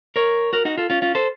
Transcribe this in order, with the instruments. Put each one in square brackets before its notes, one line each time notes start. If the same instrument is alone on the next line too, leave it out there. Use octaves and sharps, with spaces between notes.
[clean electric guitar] A#4 C#5
F#4 A#4
D#4 F#4
F4 A4
C#4 F4
C#4 F4
A4 C5